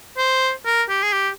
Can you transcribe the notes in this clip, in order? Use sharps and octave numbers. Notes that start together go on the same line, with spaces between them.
C5
A#4
G4
G#4
G4